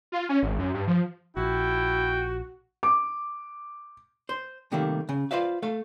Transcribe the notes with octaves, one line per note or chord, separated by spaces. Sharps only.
F4
C#4
G#1
F#2
G2
F3
A#1 E4 F#4 G5
D6
C5
C3 D#3 G3 A3 A#3
C#3
F4 B4 C5 D5 E5 F5
A3 A4 F5